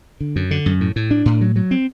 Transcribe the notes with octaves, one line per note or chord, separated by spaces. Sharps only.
D3
F#2
D3
F#2
A2
A2
D4
A2
F#3
F#3
C4